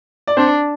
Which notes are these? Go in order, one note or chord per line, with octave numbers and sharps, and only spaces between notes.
D5
C4 D4 C5